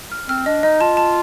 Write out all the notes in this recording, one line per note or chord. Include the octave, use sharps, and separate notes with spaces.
F6
C4 F6
D4 D#5
D#4 D#5
F4 A5
A5